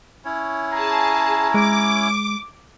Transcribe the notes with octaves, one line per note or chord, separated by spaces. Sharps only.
C#4 E4 C#5
G#4 A5 A#5
G#3 D6